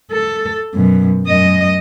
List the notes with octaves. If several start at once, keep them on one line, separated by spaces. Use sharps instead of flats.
A4
F#2 B2
F#2 D#5